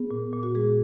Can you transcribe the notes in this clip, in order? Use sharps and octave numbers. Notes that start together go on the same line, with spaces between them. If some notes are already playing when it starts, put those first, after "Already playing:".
Already playing: B3 G#4
A#2
A#2
F#4
G#3 G#4